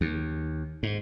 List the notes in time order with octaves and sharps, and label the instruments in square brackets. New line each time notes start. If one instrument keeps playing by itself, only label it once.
[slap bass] D#2
G#2